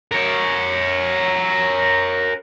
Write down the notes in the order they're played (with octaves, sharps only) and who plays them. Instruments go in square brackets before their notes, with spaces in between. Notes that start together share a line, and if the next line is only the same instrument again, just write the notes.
[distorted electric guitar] A#4 C#5